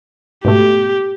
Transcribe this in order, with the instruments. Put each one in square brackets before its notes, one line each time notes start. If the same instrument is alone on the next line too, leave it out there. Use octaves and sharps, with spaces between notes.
[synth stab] G#2 B2 A3 [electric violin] G4